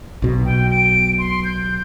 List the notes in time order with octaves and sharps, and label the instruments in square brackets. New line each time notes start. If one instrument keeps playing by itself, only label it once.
[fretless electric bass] B1 B2
[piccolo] G5
D7
C6
G6